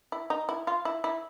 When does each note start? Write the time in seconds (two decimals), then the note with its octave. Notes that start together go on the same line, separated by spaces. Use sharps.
0.12 E4
0.30 D#4
0.49 E4
0.67 F4
0.85 E4
1.04 E4